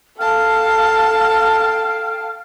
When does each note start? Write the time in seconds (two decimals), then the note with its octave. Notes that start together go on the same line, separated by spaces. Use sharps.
0.19 A4 F5 G5 A5 F6